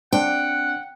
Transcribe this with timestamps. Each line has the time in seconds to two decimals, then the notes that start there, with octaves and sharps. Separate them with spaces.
0.13 C4 D4 F#5 G5